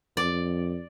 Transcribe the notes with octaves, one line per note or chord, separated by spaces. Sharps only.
F2 D5